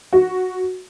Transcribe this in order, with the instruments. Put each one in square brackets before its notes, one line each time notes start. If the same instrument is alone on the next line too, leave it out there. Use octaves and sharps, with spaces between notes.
[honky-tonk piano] F#4